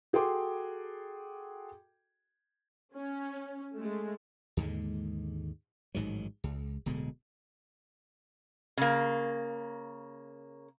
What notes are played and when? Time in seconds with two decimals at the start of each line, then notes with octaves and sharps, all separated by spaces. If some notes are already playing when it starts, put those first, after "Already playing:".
0.13 F#4 G#4 A4 G5 C6 D6
2.94 C#4
3.74 G#3 A3
4.57 D#2 G#2 D3 G#3
5.95 A1 G#2 D#3 F#3
6.44 C#2
6.86 D1 B2 D3 G#3
8.77 C#3 A#3